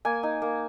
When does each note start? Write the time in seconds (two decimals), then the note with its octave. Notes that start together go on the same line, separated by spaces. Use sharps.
0.05 A#3 G#5
0.23 D#4
0.42 A#3